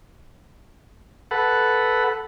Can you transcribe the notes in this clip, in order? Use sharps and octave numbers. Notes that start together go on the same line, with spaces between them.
A4 B4 F#5